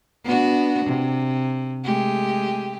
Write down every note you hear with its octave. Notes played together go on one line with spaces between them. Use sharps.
B3 D4 F#4
C3
G#3 A3 G4